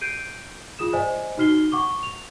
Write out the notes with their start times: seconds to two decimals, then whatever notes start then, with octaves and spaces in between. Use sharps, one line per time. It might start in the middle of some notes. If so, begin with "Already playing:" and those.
0.01 G6 C7 D7 D#7
0.79 F4 G#4 D#6 E7
0.93 C5 D5 D#5 G#5
1.38 D#4 F#4 F6 C7 G7
1.71 F#5 C#6 D6 G7
2.03 F7